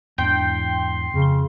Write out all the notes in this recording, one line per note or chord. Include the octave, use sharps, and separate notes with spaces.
E2 G#2 D4 G5 C6
F2 C#3